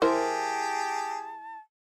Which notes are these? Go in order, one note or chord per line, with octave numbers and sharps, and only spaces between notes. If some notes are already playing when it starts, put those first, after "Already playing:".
E3 E4 G4 G#4 A#4 C5 A5